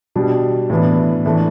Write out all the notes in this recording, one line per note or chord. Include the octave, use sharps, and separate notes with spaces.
B2 G3 D4
A2 E3 B3 D4
A2 E3 A3 D4